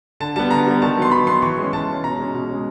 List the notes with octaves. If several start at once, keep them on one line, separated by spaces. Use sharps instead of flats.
D3 A5
G3 B3 A5
D3 A#5
G3 B3
D#3 A5
F#3 B3 C6
D#3 B5
F#3 B3 C6
E3 C#6
G#3 C#4
E3 A5
G#3 C#4
B2 A#5
G#3 C#4
B2
G#3 C#4